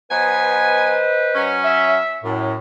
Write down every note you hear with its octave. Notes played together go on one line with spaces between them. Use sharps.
F#3 B3 B4 C5 D#5 G#5
F#3 C#4
E5
F#2 A2